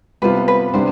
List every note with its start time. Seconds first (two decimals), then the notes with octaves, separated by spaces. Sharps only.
0.22 C3 G3 B3 F4 B4
0.48 B4
0.74 C3 G3 B3 D4 C5